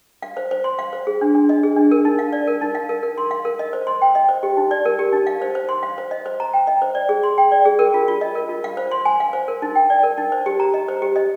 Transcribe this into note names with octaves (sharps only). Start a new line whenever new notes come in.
F5
C5
C5
C6
F5
C5
G#4
D4
D4
D#5
G#4
D4
A#4
D#4
F5
D5
A#4
D#4
F5
A#4
A#4
C6
F5
A#4
D#5
C5
C6
G5
D#5
C5
G4
D#4
D5
A#4
G4
D#4
F5
C5
C5
C6
F5
C5
D#5
C5
A#5
G5
D#5
C5
D5
G#4
C6
G5
D5
G#4
A#4
F4
F4
D#5
A#4
F4
F5
C5
C6
G#5
F5
C5
A#4
D#4
G5
D5
A#4
D#4
C5
G4
A#5
D#5
C5
G4
D#5